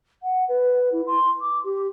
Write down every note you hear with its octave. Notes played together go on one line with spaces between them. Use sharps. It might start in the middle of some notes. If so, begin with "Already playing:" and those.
F#5
B4
E4
C6
D6
G4